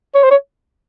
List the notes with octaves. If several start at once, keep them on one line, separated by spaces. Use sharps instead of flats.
C#5
C5
C#5